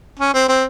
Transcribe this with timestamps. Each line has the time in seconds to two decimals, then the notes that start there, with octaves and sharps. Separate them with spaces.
0.19 C#4
0.34 C4
0.49 C4